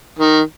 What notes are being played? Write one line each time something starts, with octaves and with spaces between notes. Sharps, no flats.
D#3